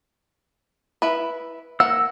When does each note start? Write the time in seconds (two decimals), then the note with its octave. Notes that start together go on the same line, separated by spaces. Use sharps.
1.02 E4 B4
1.80 A#3 F#5 E6